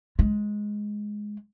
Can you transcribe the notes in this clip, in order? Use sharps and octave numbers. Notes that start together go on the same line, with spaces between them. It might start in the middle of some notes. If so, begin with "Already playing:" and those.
G#3